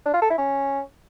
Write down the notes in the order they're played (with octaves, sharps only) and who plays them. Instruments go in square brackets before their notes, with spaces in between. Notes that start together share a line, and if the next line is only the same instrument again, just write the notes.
[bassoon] D4
F4
A4
E4
C#4